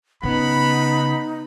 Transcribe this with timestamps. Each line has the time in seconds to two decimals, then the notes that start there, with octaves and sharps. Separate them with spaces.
0.24 C#3 B3 D#4 B5